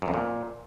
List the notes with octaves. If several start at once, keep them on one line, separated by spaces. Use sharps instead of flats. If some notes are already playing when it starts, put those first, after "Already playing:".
F#2
F2
A#2